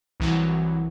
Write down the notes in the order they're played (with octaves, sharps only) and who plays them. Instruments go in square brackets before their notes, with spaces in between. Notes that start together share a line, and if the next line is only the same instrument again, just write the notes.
[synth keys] C2 E3 F#3